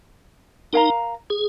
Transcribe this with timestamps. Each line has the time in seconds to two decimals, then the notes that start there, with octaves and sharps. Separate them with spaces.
0.73 D#4 A#4 F5 A#5
1.30 G#4